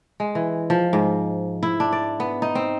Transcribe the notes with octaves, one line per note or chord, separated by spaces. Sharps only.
G#3
E3
F3
G#2
E4
D4
D5
B3
D#4
C4